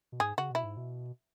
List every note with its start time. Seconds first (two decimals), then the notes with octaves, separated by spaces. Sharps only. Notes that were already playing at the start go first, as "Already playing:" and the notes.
0.12 B2
0.20 G#2 G#4
0.38 C#3 F#4
0.51 B2 E4
0.64 G#2
0.77 B2